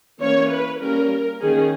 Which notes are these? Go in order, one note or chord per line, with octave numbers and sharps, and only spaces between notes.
E3 A#3 C#4 C#5
B4
G3 A#3 C#4 A#4
D#3 A#3 C#4 G#4